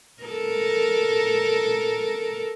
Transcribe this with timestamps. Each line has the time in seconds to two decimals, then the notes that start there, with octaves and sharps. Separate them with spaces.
0.23 A4 A#4